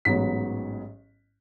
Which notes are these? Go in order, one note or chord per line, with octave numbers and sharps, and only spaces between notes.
A1 G#2 F#3 B3 B6